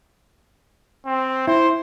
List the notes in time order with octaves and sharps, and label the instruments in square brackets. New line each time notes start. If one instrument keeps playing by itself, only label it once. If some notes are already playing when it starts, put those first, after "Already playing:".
[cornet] C4
[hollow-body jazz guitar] E4 [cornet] C5